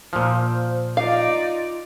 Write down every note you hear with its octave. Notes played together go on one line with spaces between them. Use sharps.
A#2 F3 C5
D#4 F4 D5 F5